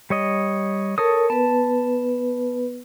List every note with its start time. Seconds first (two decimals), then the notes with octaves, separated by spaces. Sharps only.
0.10 G3 C#5 D#5
0.98 A4 A#4 C#5 D#6
1.30 B3 B4 A5